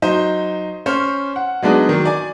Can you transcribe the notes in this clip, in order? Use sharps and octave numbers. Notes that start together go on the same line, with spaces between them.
F#3 D#4 C5
C#4 C5 F6
F#5
F#3 G#3 B3 D4 D#4
D#3 F#3
D5 G#5